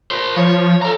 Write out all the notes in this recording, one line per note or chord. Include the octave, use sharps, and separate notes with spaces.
A#4 C5
F3 C#5
A4 A#5